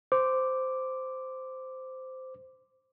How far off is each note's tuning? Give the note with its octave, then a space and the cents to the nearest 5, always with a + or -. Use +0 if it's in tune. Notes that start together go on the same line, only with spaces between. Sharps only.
C5 -10 D6 +0